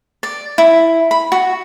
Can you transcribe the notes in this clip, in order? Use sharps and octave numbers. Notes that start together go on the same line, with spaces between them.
D5
E4
B5
F#4